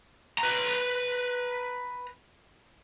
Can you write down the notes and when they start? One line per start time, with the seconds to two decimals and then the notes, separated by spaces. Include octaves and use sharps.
0.38 B4 A#5